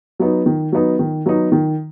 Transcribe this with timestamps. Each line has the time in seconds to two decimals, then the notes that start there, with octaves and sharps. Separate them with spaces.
0.19 F#3 B3 D#4
0.46 D#3
0.72 F#3 B3 D#4
0.99 D#3
1.26 F#3 B3 D#4
1.52 D#3